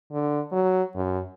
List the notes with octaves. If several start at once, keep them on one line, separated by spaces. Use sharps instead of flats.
D3
F#3
F#2